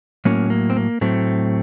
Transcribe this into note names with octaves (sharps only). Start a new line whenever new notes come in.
A2 F#3 A#3 C#4
A#3
C4
A#3
A2 F#3 A3 C4